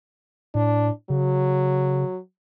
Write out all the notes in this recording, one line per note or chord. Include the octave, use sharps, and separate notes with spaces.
A2 D4
C#3 F#3